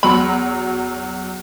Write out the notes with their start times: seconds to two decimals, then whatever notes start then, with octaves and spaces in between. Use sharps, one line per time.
0.03 E2 F#3 B5